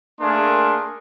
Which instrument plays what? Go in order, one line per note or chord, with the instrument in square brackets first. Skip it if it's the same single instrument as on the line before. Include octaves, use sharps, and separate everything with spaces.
[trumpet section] A3 A#3 D4 G#4 A#4 C6